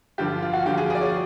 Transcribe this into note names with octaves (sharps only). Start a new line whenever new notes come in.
G2 D3 F3 G4
F4
F4
F#4
G2 D3 F3 G4
G#4
G#4
D5
C#5